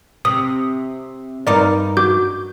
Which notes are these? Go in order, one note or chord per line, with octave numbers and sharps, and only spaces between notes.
C3 D#6
G2 D#4 A#4 D5 D6
F#4 D6 G6